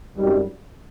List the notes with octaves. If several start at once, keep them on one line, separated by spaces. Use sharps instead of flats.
G#1 F#2 D#3 G3